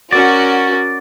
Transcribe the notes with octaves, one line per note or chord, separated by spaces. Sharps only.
C#4 F#4 A#4 D5